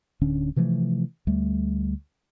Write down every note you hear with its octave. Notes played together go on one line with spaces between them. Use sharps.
D1 D3 C#4 D4
C3 E3 F3 A3
D2 G3 A3